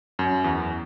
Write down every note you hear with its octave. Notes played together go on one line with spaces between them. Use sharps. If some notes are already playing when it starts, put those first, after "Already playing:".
F#2
E2